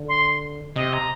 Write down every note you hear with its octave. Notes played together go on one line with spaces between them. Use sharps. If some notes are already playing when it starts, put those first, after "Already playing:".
Already playing: D3
C6
C3 D#5
A#5